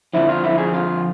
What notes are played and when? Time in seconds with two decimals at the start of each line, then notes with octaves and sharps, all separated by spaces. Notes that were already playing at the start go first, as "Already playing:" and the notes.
0.13 F2 D3 F3 E4
0.29 F4
0.44 E4
0.58 G#4
0.74 F4